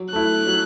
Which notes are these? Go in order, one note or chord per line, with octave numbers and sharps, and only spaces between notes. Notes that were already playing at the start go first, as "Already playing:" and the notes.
Already playing: F#3
A3 E4 F#6
F#3